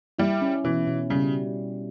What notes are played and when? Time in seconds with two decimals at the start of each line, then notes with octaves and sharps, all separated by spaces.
0.19 G3 E4
0.41 C#4
0.64 B2 E3
0.87 B2
1.10 C#3 G3